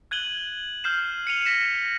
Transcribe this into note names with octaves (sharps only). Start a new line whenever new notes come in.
F#6 G#6 D#7 F#7 G7
F6 G6 C7 E7
C#7 D#7 F7 G7
A#6 B6 C#7 E7